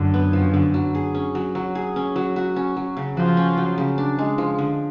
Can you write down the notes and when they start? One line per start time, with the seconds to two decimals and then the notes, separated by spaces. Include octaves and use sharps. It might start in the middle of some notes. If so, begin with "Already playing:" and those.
Already playing: F#2 D3
0.14 B3
0.33 F3
0.54 D3
0.74 F#3
0.95 G#4
1.14 C#4
1.35 F#3
1.55 F#3
1.75 G#4
1.96 C#4
2.16 F#3
2.36 F#4
2.56 C#4
2.77 F#3
2.97 C#3
3.17 F3 F#4
3.37 C#4
3.57 F#3
3.78 C#3
3.98 D4
4.19 G#3
4.38 F3
4.59 D3